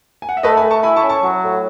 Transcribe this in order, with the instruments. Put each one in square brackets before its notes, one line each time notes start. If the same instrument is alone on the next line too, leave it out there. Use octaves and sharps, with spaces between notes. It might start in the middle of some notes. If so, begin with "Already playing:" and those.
[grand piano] G#5
F#5
E5
[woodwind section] A3 [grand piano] B4 D#5
[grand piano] G#5 B5
[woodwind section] A3
[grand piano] A5 C#6
[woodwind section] E4 [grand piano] G#5 B5
[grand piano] A5 C#6
[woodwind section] C#4
[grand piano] A5 C#6
[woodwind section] F#3
A2